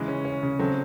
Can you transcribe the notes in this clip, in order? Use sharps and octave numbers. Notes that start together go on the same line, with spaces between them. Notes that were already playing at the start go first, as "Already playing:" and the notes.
Already playing: C#3 E3 G#3
C#4
C#4
C#3
F#3 A3 C4